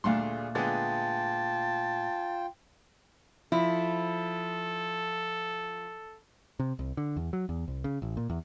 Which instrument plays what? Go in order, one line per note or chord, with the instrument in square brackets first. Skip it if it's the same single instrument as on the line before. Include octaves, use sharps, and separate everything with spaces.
[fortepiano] D2 D4 C6 [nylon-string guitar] A#2 A3 F5 [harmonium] G#4
[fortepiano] D3 G#3 B3 [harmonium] F4 G5 [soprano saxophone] A5
[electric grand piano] F3 [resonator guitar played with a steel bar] E4 [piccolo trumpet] A4
[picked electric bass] C3
C2
D3
E2
F#3
E2
C2
C#3
A1
A#2
E2